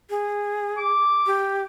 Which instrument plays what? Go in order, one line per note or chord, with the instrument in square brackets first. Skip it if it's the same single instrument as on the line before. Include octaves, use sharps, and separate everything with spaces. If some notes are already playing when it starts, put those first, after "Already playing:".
[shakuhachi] G#4
[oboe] D6
[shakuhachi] G4